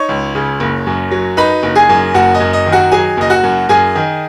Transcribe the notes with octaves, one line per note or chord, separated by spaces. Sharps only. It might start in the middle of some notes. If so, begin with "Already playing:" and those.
Already playing: D#4 C#5 C#6
C#2
C#3
F#1
F#2
F#3
D#4 B4 B5
F#1
G#4 G#5
F#2
F#1 F#4 F#5
D#5
F#2
D#5
D#3
F#4 F#5
F#3 G#4 G#5
F#1 D#5
F#4 F#5
F#2
F#2 G#4 G#5
D#3